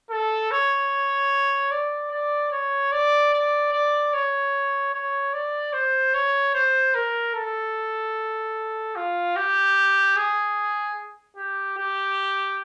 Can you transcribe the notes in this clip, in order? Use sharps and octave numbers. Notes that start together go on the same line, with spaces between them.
A4
C#5
D5
D5
C#5
D5
D5
D5
C#5
C#5
D5
C5
C#5
C5
A#4
A4
F4
G4
G#4
G4
G4